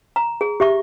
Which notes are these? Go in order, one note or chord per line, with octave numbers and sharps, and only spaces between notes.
A#5
G#4
G4 E5 C#6